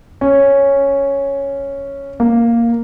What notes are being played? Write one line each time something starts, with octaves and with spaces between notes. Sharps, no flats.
C#4
A#3